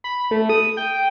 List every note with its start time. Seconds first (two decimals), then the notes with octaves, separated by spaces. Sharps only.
0.04 B5
0.31 A3
0.49 D#6
0.77 G5